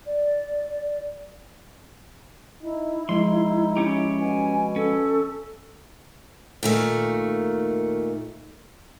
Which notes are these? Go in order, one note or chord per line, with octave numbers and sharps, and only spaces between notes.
D5
D#4 E4
F3 G#3 D#4 C6
C#4 G4
B2 G#5
C#4 A4
A#2 D#3 A3